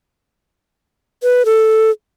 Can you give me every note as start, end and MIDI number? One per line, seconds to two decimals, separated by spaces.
1.23 1.45 71
1.45 1.90 69